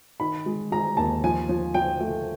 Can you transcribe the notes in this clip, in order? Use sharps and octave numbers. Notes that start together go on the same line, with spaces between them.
D#3 B5
G#3
G#3 A#5
D#2 A5
F3 G#5
F3
F3 G5
A3